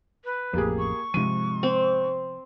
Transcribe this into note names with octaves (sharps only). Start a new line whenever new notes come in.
B4
A1 F2 A#3 G4 G#4
C#6
G#2 C3 F3 D#7
C4